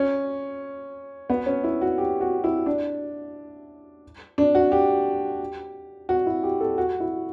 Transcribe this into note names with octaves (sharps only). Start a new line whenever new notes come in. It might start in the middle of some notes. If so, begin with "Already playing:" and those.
Already playing: C#4
B3
C#4
E4
F#4
G4
F#4
E4
D4
D4
F#4
G4
F#4
E4
G4
A4
F#4
E4